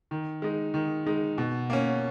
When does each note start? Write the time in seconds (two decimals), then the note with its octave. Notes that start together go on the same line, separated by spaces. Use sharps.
0.11 D#3
0.42 G#3 D#4
0.74 D#3
1.06 G#3 D#4
1.38 B2
1.70 A#3 C#4